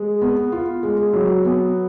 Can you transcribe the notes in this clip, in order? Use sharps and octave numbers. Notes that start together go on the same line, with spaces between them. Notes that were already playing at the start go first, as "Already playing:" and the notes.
Already playing: G#3
B3
F4
G#3
F#3
B3